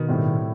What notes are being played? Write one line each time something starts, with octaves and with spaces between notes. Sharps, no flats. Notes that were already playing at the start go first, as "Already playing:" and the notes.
Already playing: B2 D#3
A2 G3 C4 E4